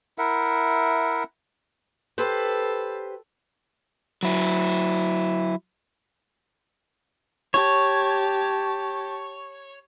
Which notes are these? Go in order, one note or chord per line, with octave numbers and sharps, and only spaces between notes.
E4 A#4 E5 F#5
G4 A4 B4 C5
F#3 E4
G4 C#5 A5